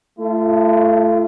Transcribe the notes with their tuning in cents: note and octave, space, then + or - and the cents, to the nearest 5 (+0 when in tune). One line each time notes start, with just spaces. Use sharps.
A3 +0 F4 -35